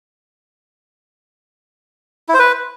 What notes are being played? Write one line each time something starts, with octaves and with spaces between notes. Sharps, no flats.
E4
C5
B4